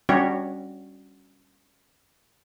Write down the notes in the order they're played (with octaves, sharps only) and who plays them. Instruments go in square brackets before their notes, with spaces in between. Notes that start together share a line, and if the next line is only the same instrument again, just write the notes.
[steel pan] G3 C#4 D4 F#4 G4 C#5